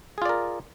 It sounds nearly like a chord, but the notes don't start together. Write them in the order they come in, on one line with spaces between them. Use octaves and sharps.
G#4 F4 D5 A#4